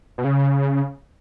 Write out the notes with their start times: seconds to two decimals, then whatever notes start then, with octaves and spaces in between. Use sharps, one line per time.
0.18 B2
0.24 C#3